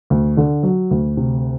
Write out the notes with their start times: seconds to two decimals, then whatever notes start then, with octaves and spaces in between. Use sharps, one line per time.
0.10 D2
0.37 D3
0.63 F#3
0.91 D2
1.17 C3